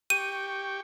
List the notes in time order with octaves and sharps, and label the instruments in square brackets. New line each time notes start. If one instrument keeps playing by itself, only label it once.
[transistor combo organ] G4 G5 C#6 [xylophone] D#7